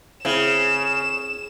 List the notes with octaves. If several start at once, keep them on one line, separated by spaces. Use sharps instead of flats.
C#3 C4 E4 E7